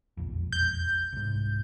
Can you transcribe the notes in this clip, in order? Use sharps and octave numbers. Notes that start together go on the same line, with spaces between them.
E1 A#1 F2
G6
C2 G#2